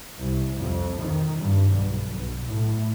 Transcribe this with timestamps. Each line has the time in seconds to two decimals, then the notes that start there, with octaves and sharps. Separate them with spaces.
0.20 C2
0.56 F2
1.01 D#3
1.40 G2
1.73 B1
2.17 B1
2.45 A2